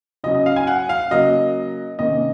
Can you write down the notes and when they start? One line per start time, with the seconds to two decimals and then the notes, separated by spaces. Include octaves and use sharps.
0.24 C#3 F#3 C#4 D#5
0.35 D#5
0.46 F5
0.56 G#5
0.67 F#5
0.89 F5
1.11 C#3 F#3 A#3 D#5
1.99 C3 D#3 A#3 C#4 D#5